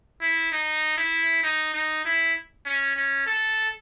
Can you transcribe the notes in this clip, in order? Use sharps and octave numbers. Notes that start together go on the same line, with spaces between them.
E4
D#4
E4
D#4
D#4
E4
C#4
C#4
A4